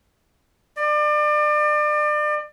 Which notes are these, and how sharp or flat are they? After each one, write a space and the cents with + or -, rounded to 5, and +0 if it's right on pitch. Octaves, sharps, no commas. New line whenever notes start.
D5 +35